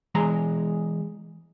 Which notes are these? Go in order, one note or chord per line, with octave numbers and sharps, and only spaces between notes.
E3 G#3 A#5